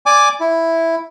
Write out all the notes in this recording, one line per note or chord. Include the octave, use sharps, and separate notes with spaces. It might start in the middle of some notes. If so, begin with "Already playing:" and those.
D5 G#5 D6
E4